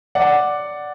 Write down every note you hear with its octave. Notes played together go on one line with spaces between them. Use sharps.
D5 F#5